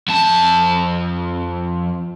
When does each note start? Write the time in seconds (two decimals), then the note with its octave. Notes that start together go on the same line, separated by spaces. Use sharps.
0.08 F2 A5